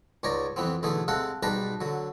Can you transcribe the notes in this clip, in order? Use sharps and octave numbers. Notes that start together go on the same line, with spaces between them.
C#2 G#2 C#5 D5 A#5
F2 E3 B3 C4
B1 D3 E3 A3 G#4
C3 G#3 A4 F5 F#5 C6
B1 G#2 G3 B4 A5 A#5
D3 F#3